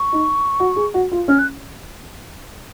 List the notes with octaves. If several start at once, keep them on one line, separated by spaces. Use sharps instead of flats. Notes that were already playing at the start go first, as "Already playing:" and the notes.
Already playing: C#6
D#4
F#4
G#4
F#4
F4
C#4 F6
F#6